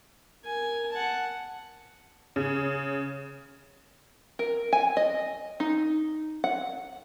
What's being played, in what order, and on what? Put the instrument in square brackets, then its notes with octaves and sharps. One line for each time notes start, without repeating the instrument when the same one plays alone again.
[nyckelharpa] A#4 G#5
F#5 A5
[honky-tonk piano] C#3
[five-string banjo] A#4
G#5
D#5
D#4
F#5